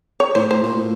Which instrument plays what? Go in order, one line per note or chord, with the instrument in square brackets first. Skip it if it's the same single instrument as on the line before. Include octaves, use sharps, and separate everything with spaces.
[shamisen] C#5
[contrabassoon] A2 [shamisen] C5
[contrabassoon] A2 [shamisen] C5
[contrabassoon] A#2
A2